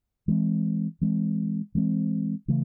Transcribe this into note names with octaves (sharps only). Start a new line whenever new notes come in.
E3 G#3 C4
E3 G#3 C4
E3 G#3 C4
C#3 E3 A3